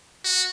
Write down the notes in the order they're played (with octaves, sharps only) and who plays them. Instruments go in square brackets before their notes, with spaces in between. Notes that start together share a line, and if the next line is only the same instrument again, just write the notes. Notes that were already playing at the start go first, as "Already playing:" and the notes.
[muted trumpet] F#4